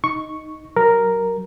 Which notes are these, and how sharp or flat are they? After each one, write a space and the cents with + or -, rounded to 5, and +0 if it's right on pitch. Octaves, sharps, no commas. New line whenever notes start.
D#4 +0 C#6 +0
F#3 +20 A#4 +0